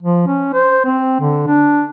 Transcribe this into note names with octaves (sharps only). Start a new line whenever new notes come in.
F3
C#4
C5
C4
D3
D4